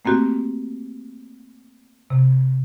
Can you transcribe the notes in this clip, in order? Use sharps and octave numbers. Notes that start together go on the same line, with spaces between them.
A3 A#3 C4 F#4 G4
C3